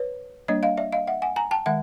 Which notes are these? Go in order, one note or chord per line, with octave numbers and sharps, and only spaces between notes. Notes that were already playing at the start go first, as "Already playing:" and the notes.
Already playing: B4 C#5
G3 A#3 D4 C#5 D#5
D#5 F5
D5 E5
D#5 F5
E5 F#5
F#5 G#5
G#5 A#5
G5 A5
D#3 G#3 E5 F#5